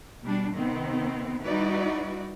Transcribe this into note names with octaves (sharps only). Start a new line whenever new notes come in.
B2 G3 D4
C3 D#3 B3 C4
G3 D#4 E4 F#4 B4 D5